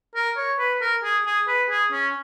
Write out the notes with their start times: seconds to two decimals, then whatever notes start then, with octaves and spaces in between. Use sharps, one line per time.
0.15 A#4
0.37 C#5
0.59 B4
0.81 A#4
1.03 G#4
1.26 G#4
1.48 B4
1.70 G#4
1.92 C#4